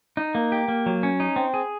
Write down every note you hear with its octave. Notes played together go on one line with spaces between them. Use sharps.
D#4
A#3
G4
A#3
F#3
C#4
D#4
C4
G#4